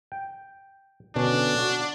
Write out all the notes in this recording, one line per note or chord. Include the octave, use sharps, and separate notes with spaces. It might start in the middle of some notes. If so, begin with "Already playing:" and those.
G5
B2 D3 C#4 D4
F#4